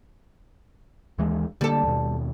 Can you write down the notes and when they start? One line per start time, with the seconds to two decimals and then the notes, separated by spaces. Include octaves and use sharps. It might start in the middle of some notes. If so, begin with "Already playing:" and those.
1.18 D#2 E3 G#3
1.61 D3 G3 A#3 A4
1.83 D#2 B2